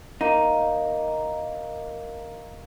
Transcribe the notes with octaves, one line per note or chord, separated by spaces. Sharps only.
A#3 D#4